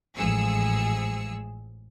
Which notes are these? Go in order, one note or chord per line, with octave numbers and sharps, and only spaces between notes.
A1 G#2 F3 G#4 E6 C#7